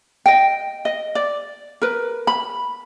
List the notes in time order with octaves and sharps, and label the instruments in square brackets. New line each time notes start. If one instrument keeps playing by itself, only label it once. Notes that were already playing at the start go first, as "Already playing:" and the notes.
[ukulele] D#5 G5
D#5
D5
A#4 B4
B5